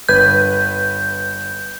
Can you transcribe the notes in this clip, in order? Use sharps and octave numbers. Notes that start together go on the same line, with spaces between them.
G1 B4 G6 G#6